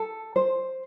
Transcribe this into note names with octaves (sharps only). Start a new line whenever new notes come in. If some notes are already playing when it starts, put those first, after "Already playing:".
Already playing: A4
C5